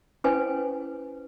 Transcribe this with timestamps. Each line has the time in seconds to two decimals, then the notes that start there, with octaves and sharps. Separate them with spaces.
0.24 C#4 E4 B4 C5 G#5